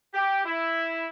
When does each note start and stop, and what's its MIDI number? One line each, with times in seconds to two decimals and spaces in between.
0.14 0.44 67
0.44 1.07 64